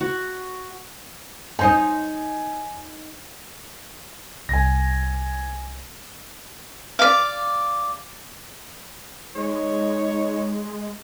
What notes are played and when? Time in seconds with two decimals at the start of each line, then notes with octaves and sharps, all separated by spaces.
0.01 F#4
1.59 D#4 C5 D#5 G#5
4.49 C2 G#5 A#6
6.99 D5 F5
9.36 G#3 D#4 C#5